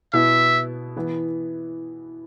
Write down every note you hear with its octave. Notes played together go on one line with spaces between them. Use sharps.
B2 B3 E4 E5
E3 B3